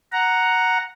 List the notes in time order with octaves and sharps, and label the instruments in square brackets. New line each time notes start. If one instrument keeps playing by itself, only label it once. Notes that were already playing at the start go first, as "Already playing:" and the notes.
[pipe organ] F#5 A#5